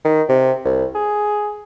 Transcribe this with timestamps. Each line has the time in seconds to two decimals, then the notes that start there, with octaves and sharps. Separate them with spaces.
0.05 D#3
0.29 C3
0.65 C2
0.95 G#4